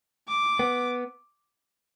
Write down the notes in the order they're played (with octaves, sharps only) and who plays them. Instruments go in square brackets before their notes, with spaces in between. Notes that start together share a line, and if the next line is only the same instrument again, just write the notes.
[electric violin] D6
[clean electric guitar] B3